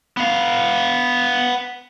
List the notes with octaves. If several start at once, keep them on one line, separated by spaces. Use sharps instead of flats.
B3 F5